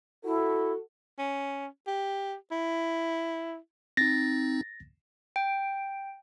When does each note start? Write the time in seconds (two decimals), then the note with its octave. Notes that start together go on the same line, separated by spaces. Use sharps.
0.24 E4 F#4 A4
1.19 C#4
1.87 G4
2.51 E4
3.97 C4 D#4 A6 A#6
5.36 G5